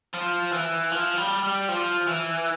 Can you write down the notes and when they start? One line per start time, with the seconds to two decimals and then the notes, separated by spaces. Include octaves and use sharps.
0.14 F3
0.52 E3
0.91 F3
1.17 G3
1.43 G3
1.68 F3
2.08 E3